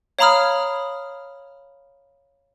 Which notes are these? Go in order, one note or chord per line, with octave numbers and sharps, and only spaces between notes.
C#5 F5 A#5 B5 D#6 F6